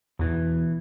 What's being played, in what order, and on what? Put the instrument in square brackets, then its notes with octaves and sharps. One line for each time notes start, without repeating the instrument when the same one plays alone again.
[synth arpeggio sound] E2 [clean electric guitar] B2 E3